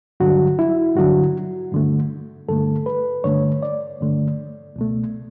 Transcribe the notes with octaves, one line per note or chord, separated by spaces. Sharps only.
G2 D3 F#3 F#4
E4
G2 D3 F#3 F#4
G2 D3 A3
G2 D3 A3 A4
B4
G2 D3 A3 C#5
D5
G2 D3 A3
C#2 B2 A3